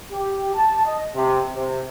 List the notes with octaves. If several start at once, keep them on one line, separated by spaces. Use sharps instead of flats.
G4
A5
D#5
C3
C3